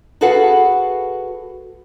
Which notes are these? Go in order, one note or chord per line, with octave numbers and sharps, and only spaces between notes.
F#4 G#4 A4 B4 F5 F#5